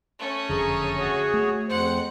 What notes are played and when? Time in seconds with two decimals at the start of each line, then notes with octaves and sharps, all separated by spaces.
0.19 A3 C#4
0.50 F#1 F2 D3 G#4 A#5
0.97 F#4 G#4 C#5
1.34 A3
1.69 F2 C5 F#5